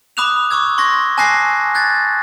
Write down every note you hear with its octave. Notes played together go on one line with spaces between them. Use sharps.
B5 D6 D#6 F#6 E7 F7
C#6 D6 E6 G#6
C6 C#6 G#6 A#6
G#5 A5 D6 F#6 A#6 C7
F#6 G#6 A6